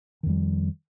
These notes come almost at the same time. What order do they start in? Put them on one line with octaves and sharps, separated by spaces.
D#3 F2 G3 F3